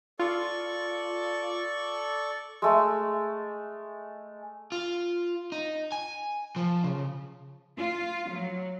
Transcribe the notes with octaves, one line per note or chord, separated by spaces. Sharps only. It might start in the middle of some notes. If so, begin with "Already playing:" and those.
F4 A4 D5 C#6
G#3 A3
F4
D#4
G#5
F3
C#3
F4
F#3